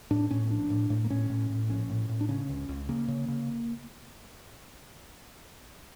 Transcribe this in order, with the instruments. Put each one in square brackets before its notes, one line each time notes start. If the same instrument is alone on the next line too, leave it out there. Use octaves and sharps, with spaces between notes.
[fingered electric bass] A2 D4
A2 C#4
A#1 D4
A2
A2
A#3
A2 C#4
A2
A2
A#1 C#4
A2
A2
D4
C#3 C#4
C#2
C#2
C#3 A#3
C#3
C#3